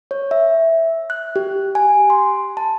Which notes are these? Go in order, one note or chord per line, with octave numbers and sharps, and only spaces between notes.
C#5
E5
F#6
G4
G#5
C6
A5